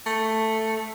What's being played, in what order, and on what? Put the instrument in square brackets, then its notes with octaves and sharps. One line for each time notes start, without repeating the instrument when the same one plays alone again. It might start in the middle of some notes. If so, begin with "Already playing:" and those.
[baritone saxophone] A3